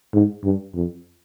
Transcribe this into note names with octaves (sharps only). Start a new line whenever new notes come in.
G#2
G2
F2